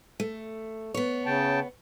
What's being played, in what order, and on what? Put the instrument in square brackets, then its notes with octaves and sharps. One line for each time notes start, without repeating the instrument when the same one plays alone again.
[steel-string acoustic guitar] A3
B3 C#5
[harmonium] C#3 G5 A5